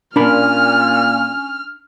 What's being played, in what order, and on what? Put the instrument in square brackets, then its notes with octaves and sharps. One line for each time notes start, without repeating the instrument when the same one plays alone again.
[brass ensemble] A#2 [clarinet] C#4 [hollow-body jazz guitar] D4 A#4 B5 [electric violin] F6